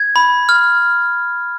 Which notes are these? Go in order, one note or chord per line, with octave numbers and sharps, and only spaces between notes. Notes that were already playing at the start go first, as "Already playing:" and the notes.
Already playing: G#6
B5
F6